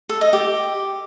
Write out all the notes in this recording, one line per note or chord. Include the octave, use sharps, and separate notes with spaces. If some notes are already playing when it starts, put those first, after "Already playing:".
A4
D#5
G4